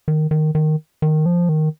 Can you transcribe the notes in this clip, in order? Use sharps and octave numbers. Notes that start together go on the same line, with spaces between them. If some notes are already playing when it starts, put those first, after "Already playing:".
D#3
D#3
D#3
D#3
F3
D#3